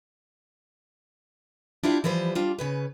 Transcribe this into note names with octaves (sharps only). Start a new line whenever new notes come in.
D4 E4 F4 G4
E3 F3 G3 B4 C5
G3 D4 F4
C#3 C#4 B4